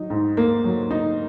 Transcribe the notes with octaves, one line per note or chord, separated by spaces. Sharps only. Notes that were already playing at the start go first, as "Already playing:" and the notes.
Already playing: F#3 D#4
G#2
A#3
F#3
D#4